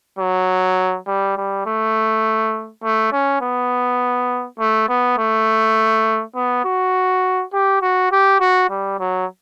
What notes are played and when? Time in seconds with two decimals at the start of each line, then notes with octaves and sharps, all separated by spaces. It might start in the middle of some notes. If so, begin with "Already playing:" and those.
0.19 F#3
1.07 G3
1.37 G3
1.66 A3
2.83 A3
3.12 C#4
3.41 B3
4.60 A3
4.89 B3
5.18 A3
6.35 B3
6.64 F#4
7.53 G4
7.82 F#4
8.11 G4
8.40 F#4
8.70 G3
8.99 F#3